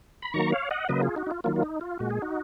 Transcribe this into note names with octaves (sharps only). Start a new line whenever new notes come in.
B5
D#3 F#3 A#3 A#5 C#6
C#5 F5
D#5 F#5
C#3 F#3 A#3 B4 D#5
F4 G#4
D#4 F#4
D#4
F4
D#3 F#3 A#3 F4
F4
D#4
F4
A#2 G#3 F#4
G#4
D#4 F#4